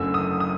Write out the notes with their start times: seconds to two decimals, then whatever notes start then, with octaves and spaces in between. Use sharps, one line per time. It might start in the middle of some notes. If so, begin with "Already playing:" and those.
Already playing: F#1 F#2 D3 F#3 A3 E6
0.14 D#6
0.40 D#6